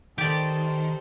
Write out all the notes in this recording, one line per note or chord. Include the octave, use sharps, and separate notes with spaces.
D#3 G4 A4 C5 D5